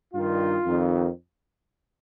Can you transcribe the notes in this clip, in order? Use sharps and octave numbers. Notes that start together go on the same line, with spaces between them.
G2 D#3 F4
F2 D#3